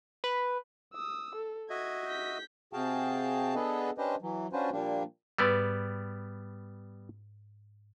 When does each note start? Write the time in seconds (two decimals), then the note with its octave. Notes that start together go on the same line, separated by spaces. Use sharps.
0.24 B4
0.93 D#6 E6
1.35 A4
1.70 F#4 D#5 E5 G#6
2.07 G6 B6
2.73 C3 F#4 G#4 F5 G5 A5
3.55 B3 D4 G#4 A4 B4 D#5
3.98 C#4 D4 G4 B4 C5 D#5
4.22 E3 F#3
4.53 C#4 D4 F4 F#4 B4 C5
4.71 A#2 F3 G3 A#3 D4
5.38 G#2 G3 B3 B4 D5 E6